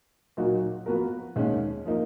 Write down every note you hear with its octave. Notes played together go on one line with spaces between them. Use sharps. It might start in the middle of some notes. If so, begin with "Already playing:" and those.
A#2 F#3 A#3 D#4 F#4
F3 B3 F#4 A#4
D#2 D#3 G#3 C#4
F3 A#3 D#4